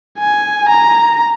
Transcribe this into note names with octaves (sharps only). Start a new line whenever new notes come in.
G#5
A#5